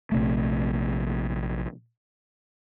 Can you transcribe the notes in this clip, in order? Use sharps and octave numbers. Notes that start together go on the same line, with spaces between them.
A#1 C3 A3